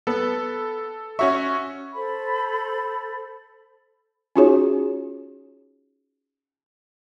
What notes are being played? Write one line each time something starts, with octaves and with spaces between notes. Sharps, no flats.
B3 A4
C#4 F#4 C#5 E5 C#6
A4 C5 B5
C#4 D#4 F4 F#4 G#4 C#5